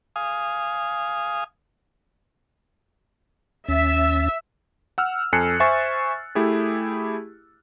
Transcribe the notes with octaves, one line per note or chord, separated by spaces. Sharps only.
F5 G#5 D#6
D#2 C#4 E5 A6
F#5 E6 F6
F2 A4 G#5 F#6 C7 C#7
C5 E5 G#5 C#6 A6
A3 E4 G4 G#4